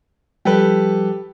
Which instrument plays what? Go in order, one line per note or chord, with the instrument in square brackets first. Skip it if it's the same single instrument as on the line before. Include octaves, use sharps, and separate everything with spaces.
[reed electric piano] F3 G3 [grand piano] G4 A4 B4